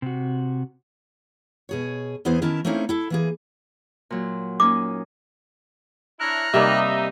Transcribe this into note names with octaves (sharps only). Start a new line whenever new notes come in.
C3 F#4
B2 G#4 C#5
E2 B3 E4 G#4 C5
D#3 C#4 E4 A#4 A5
A3 A#3 C4 C#4 D#4 E4
E4 A4
E3 A#3 G#4
A#2 F#3
A#3 C#4 D#4 D6
D4 E4 C#5 A#5 F6 F#6
C3 G3 A#3 D#4 E5